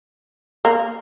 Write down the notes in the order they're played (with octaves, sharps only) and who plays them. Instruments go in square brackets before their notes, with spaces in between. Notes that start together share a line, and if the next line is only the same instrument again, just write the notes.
[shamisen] A#3